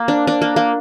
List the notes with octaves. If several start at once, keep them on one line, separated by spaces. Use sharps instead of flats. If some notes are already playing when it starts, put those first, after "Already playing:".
Already playing: A#3
D4
D4
A#3
A#3